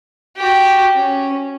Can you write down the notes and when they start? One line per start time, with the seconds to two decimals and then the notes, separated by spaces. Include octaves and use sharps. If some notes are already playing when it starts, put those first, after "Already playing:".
0.37 F#4 G4
0.95 C#4